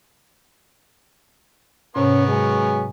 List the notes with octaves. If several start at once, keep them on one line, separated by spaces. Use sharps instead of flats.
G#2 C3 B3 C#4 A#4 C#6
F#3 G#3 C#4 G#5